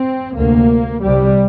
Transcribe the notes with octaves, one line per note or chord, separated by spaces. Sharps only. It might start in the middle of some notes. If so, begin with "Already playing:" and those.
Already playing: C4
D2 C3 A#3
C2 C3 G3